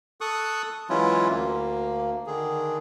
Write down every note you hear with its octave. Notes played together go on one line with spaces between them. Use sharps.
A4 C#6 D#6 F#6
E3 F#3 G#3 C#4 E4 F4
D2 A#3
D3 D#3 G#4